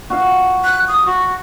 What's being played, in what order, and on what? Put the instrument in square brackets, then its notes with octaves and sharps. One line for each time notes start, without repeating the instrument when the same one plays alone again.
[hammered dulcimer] F#4 F5
[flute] F#6
D#6
F#4